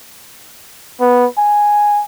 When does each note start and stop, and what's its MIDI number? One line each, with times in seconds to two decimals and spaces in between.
1.00 1.26 59
1.38 2.03 80